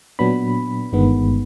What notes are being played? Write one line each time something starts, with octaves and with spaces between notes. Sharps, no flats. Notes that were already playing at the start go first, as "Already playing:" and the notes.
A#2 F#3 B3 D4 B5
G1 G2 D#3 G#3 B3